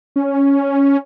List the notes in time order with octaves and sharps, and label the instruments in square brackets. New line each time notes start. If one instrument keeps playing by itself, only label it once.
[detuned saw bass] C#4